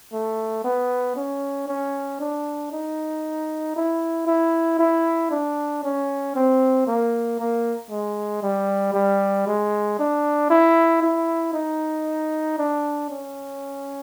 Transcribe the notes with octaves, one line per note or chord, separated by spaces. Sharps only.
A3
B3
C#4
C#4
D4
D#4
E4
E4
E4
D4
C#4
C4
A#3
A#3
G#3
G3
G3
G#3
D4
E4
E4
D#4
D4
C#4